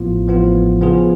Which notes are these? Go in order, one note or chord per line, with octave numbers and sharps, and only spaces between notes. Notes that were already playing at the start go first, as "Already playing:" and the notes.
Already playing: A1 A2 F3 B3 F4
A1 A2 F3 B3 F4
C#3 F3 B3 F4 G#4